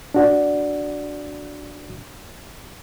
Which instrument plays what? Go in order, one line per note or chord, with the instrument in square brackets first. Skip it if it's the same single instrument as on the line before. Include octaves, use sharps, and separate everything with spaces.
[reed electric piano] D4 F#4 D5